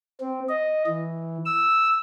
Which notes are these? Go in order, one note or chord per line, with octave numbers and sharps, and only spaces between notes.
C4
D#5
E3
E6